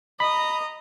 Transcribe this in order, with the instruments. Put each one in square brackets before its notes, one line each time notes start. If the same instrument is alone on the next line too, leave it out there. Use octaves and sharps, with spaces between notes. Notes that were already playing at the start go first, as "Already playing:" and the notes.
[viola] D#5 A#5 [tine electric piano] B5